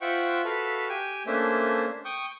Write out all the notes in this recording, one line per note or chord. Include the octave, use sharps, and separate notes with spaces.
F4 C5 E5 F#5 G5 C#6
F#4 A4 B4 E5 F5
G4 G5 G#5
A3 A#3 C#4 D4 C5 E5
G5 C#6 D#6 G6